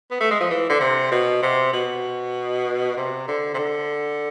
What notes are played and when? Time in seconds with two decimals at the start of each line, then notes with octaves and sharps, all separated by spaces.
0.11 B3
0.20 A3
0.31 G#3
0.40 F3
0.50 E3
0.69 D3
0.80 C3
1.11 B2
1.42 C3
1.73 B2
2.97 C3
3.28 D3
3.54 C3
3.58 D3